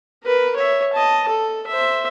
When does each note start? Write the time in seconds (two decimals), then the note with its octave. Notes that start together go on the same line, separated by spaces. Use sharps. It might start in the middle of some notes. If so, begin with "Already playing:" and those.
0.23 A#4 B4
0.56 C#5 E5
0.93 D#5 A5
1.28 A4
1.67 C5 E5